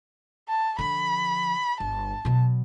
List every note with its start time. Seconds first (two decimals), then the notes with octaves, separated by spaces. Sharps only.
0.48 A5
0.79 D3 F3 B5
1.80 G1 A5
2.25 B2 F#3